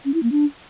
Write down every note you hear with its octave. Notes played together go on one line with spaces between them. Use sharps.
C#4
E4
A#3
D4